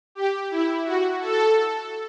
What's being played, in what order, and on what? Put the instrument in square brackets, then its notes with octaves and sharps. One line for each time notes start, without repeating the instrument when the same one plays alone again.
[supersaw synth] G4
E4
F#4
A4